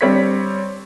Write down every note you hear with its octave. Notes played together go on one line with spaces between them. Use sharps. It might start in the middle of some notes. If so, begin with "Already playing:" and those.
G3 C4 D4 C#5 B6